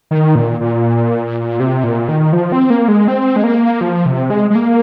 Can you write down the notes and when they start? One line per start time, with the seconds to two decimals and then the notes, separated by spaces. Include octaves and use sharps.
0.11 D#3
0.35 A#2
0.61 A#2
1.60 C3
1.84 A#2
2.08 D#3
2.33 F3
2.52 C4
2.70 A#3
2.88 G#3
3.08 C4
3.36 G#3
3.44 A#3
3.81 F3
4.06 C3
4.30 G#3
4.50 G#3
4.55 A#3